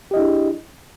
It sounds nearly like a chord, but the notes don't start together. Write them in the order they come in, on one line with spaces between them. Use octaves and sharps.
G4 D#5 E4 D4 G#4